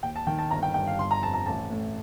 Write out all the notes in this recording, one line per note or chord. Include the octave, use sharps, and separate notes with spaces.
D#2 G5
A5
D#3 G5
A5
G1 A#5
G5
G2 G5
F5
G1 C6
A#5
F2 A5
A#5
A1 A5
A2